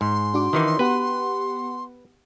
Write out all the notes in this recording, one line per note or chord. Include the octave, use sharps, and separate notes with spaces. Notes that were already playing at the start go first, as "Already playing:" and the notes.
G#2 C6
D4 F#4 D6
D#3 E3 D#4
B3 G4 B4 F#5